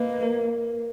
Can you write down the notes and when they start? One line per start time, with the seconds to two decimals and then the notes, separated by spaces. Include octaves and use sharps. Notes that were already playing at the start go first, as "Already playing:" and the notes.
Already playing: A#3 B4 D#5
0.23 A#4